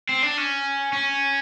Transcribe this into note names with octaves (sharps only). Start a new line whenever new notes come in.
C4
D4
C#4
C#4